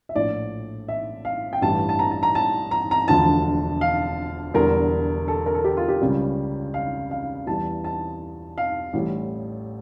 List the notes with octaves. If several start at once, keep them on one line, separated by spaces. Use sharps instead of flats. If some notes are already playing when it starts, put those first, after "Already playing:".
E5
A#1 A2 F3 D5
E5
F5
G5
A1 G2 E3 G3 A5
A5
A#5
A5
A#5
A5
A#5
A#5
E1 D2 D3 F3 A5
F5
E1 E2 D3 G3 A#4
A4
A#4
A4
G4
F4
G4
C#2 C#3 G3
F5
F5
E2 E3 G3 A5
A5
F5
A1 A2 G3